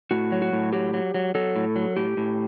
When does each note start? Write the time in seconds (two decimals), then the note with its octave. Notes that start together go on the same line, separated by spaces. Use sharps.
0.11 A2 F#4
0.32 F#3
0.42 F#4
0.53 A2
0.73 F#3 G4
0.94 F#3
1.14 F#3
1.35 F#3 A4
1.56 A2
1.76 F#3
1.97 A2 G4
2.17 A2